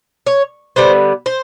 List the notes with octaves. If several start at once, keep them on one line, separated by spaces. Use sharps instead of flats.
C#5
D3 G3 B3 C5
C5